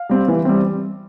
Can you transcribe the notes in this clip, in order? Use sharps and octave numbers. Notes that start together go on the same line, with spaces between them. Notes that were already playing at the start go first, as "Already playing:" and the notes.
Already playing: F5
G3 C4
E3
G3 C4